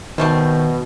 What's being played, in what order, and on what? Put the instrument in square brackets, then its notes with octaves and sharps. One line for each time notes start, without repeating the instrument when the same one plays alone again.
[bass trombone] B2 [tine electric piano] D#3 [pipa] G3 A3 C4